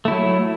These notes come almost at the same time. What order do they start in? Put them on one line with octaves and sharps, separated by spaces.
A3 E4 F#3